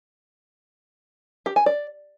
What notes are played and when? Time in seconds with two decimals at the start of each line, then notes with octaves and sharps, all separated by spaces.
1.46 G4
1.56 G#5
1.66 D5